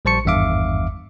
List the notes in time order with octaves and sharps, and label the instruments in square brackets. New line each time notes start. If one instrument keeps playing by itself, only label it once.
[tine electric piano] A#1 G3 C5 A5 C#6 C#7
G#1 E2 G2 E5 F5 D6